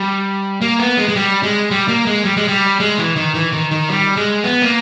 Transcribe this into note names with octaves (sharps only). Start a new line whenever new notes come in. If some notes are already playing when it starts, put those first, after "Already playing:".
Already playing: G3
A#3
B3
G#3
G#3
G3
G#3
G3
A#3
G#3
G3
G#3
G3
G#3
E3
D#3
E3
D#3
D#3
G3
G#3
B3
A#3